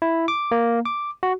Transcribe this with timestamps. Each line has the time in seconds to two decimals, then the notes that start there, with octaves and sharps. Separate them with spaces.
0.02 E4
0.28 D6
0.51 A#3
0.86 D6
1.23 F#4